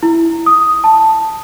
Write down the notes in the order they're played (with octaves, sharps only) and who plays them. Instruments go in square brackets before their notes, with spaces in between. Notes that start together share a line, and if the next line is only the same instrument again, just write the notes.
[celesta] E4
D#6
A5